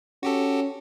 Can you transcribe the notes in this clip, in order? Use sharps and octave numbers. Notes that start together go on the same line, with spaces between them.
C#4 F#4 G4 A4